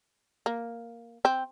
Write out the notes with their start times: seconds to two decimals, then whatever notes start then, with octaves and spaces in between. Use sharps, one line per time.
0.46 A#3
1.25 C4